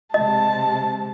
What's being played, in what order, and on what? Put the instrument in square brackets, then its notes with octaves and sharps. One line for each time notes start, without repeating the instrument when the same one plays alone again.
[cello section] C3 G#3 [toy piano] D#5 [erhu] A5